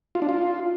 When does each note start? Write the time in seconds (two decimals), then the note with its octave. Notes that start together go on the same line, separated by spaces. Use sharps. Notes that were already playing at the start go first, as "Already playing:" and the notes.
0.15 F4
0.22 D4
0.29 F4